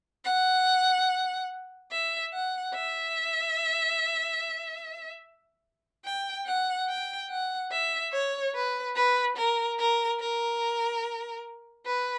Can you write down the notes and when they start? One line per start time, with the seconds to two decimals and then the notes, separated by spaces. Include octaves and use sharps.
0.25 F#5
1.91 E5
2.33 F#5
2.74 E5
6.05 G5
6.46 F#5
6.88 G5
7.30 F#5
7.72 E5
8.13 C#5
8.54 B4
8.96 B4
9.37 A#4
9.79 A#4
10.20 A#4
11.86 B4